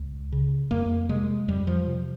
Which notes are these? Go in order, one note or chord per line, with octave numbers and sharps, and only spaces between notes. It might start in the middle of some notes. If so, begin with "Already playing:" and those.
Already playing: C#2
C#3
F2 A#3
C3 G#3
F2 G3
F3
C3